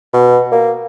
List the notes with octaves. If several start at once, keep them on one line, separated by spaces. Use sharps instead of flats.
B2
A#3